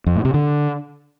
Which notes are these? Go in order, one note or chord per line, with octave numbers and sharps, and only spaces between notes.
F2
A2
C3
D3